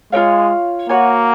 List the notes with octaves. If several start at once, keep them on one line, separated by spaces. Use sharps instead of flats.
G#3 F4 A#4 C#5 F5
A#3 F#4 C#5 G#5